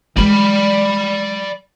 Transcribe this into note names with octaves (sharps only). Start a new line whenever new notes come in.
E3 G#3 D5 B5